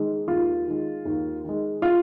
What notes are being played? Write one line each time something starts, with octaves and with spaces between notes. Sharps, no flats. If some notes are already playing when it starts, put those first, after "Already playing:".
Already playing: D#3 G#3
D#2 F4
D#3 G#3
D#2
D#3 G#3
F4